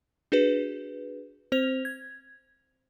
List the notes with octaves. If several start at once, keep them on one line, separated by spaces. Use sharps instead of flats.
D4 F#4 G#4 B4
C4 C5 F7
G#6